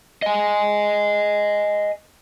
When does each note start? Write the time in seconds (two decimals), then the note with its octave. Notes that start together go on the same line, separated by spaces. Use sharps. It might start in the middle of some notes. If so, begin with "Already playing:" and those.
0.22 D#5 G#5